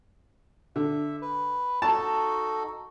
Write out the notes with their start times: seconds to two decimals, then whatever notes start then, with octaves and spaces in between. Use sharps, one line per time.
0.76 D3 E5
1.22 B4
1.82 D#4 F#4 A4 A5